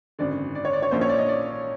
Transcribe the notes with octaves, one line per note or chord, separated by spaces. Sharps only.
G#1 F#2 D3 D5
D5
C#5
D5
C#5
A#1 A#2 F3 A#3 C#4 C5
C#5
D5
D#5
D5